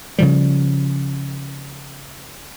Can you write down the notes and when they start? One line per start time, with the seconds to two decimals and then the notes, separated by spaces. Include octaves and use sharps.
0.19 C#3 F3 G3